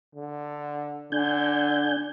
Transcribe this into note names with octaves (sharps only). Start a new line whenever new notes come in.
D3
D3 D4 G#5 G6